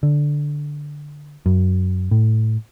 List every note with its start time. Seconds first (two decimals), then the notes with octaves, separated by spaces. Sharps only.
0.03 D3
1.46 F#2
2.11 A2